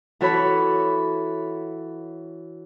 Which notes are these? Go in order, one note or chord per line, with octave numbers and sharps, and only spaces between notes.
E3 F#4 A4 C#5 B5